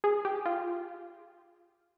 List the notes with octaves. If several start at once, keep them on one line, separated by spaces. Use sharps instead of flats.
G#4
G4
F4